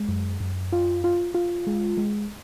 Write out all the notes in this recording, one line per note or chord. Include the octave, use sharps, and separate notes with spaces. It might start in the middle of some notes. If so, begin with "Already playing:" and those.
Already playing: G#3
F#2
F#2
F4
F4
F4
G#3
G#3